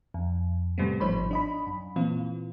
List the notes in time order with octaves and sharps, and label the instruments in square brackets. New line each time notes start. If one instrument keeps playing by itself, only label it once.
[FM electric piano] F2
A2 C3 G3 A3 B3 C4
G#1 F3 D#4 C5 C#5 B5
D4 D#5 B5
F#2
A#2 E3 C4 F4